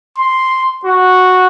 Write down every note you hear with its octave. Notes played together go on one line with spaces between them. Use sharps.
C6
F#4